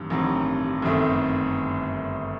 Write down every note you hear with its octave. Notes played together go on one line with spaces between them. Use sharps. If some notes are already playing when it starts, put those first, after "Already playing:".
Already playing: A1 G2 D#3 F#3 C4
A1 G2 D#3 F#3 C4
G1 F#2 D#3 A3 C4